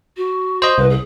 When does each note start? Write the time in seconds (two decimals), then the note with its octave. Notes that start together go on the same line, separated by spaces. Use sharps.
0.17 F#4
0.62 C5 D#5
0.78 C2 B4
0.90 G#4